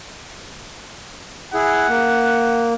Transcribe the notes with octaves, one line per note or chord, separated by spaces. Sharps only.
E4 G#4 F#5
A#3